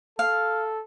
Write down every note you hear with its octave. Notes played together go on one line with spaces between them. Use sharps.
A4 F5